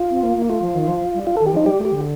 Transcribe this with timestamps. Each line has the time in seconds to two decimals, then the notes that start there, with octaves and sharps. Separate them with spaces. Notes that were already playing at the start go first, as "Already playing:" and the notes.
Already playing: F4
0.10 C4
0.23 A#3
0.36 A#3
0.49 A3 F4
0.62 F3
0.75 D#3
0.88 F3
1.14 G3
1.27 F4
1.37 D#3 A4
1.46 G4
1.53 F3 D#4
1.66 G3 G4
1.79 A3
1.85 G4
1.92 D3